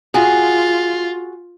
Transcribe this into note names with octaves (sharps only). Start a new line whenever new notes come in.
F4 F#4 G#4